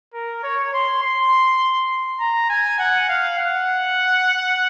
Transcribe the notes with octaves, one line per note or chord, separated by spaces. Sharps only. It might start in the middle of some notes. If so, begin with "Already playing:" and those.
A#4
C#5
C6
C6
A#5
G#5
F#5
F5
F#5